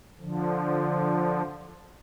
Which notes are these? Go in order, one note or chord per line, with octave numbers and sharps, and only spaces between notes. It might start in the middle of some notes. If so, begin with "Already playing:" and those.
D3 F3